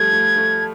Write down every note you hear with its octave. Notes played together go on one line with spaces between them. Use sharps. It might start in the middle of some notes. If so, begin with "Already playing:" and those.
Already playing: F3 G3 A3 G#6
A3
A3